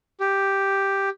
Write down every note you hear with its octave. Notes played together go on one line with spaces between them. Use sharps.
G4